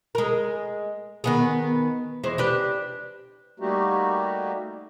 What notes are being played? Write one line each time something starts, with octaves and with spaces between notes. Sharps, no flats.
G#3 A#4
D#3 B3 G#4
E2 G#3 C5
D4 G4 B4
G3 A3 A#3 D#4 F#4 G4